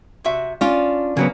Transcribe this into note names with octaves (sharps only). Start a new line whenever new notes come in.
C3 F#4 E5
C#4 D4 F4
C#3 F#3 A#3 B3